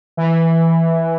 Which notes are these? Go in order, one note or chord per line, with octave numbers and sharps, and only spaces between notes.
E3